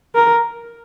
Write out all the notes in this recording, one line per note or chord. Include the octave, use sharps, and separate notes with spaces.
A#4